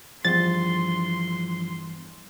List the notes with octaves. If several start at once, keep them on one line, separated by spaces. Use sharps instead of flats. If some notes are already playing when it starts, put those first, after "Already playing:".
E2 G2 F3 C6 A6